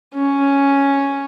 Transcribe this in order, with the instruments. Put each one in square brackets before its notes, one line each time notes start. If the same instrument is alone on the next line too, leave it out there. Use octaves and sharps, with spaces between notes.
[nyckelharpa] C#4